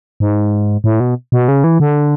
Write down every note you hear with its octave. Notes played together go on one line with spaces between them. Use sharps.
G#2
A2
B2
B2
C#3
E3
D3